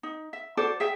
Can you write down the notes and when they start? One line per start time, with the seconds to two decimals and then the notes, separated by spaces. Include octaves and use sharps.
0.03 D#4
0.33 E5
0.57 F#4 A4 C5 D5
0.80 G#4 E5 G5